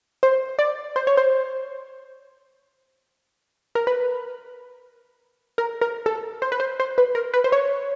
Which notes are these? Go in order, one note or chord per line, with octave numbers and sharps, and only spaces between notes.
C5
D5
C5
C#5
C5
A#4
B4
A#4
A#4
A4
C5
B4
C5
C5
B4
A#4
B4
C5
C#5